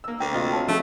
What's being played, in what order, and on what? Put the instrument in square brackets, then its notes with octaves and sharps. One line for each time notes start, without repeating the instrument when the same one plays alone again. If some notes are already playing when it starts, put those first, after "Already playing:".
[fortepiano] A#3 E6
[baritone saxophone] D2 [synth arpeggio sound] G5
[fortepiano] C3 F4 D#5 [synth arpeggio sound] F6 A6
[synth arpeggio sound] C#5 A5
[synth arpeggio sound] F3 C#4 G#4 [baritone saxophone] A3 [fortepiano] E5